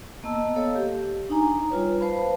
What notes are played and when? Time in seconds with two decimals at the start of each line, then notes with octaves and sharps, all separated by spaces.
0.24 A#3 B3 D#5 A5 E6
0.56 A4 C#5 D#5 F5
0.75 G4
1.29 D4 D#4 G#5 A#5
1.70 G3 F4 B4 C#5
2.01 B4 C5 F5 A5 B5